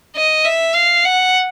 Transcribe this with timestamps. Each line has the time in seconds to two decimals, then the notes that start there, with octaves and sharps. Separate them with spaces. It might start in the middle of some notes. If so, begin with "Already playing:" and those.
0.16 D#5
0.45 E5
0.75 F5
1.05 F#5